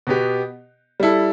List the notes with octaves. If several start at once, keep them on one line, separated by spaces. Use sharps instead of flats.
B2 B3 G4
G3 E4 A4